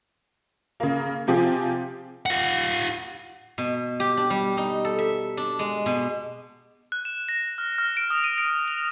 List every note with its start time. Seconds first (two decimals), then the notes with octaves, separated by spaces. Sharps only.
0.80 C#3 A#3
1.27 C3 F3 G4 G#4
2.26 F4 F#5
3.58 B2
4.00 G4
4.17 D4
4.30 G3
4.57 D#4
4.85 A4
4.99 E5
5.37 D4
5.59 G#3
5.86 B2
6.92 F#6
7.05 E7
7.29 A#6
7.58 F6
7.78 F6
7.97 D7
8.10 D#6
8.24 D#7
8.38 D7
8.68 F7